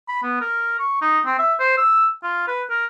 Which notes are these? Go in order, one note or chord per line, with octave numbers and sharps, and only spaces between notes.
B5
B3
A#4
C#6
D#4
C4
E5
C5
E6
F4
B4
A#4